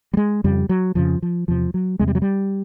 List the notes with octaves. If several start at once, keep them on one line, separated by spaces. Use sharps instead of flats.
G3
G#3
F2 C#3 G3
F#3
F2 C#3 F3
F3
E2 C3 F3
F#3
E2 C3 G#3
G3
F#3
G3